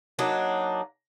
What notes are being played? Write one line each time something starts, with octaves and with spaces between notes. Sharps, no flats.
F#3 A#3 D4 D#4